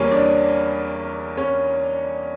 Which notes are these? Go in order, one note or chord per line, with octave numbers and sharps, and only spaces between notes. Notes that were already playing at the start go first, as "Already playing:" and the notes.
Already playing: E2 E3 G3 A#3 C#4 A#4 C#5
D4 D5
C#4 C#5